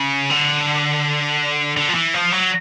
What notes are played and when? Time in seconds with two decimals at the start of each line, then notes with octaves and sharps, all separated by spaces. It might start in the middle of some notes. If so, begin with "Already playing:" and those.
Already playing: C#3
0.30 D3
1.77 D3
1.88 F3
1.94 E3
2.14 F3
2.32 F#3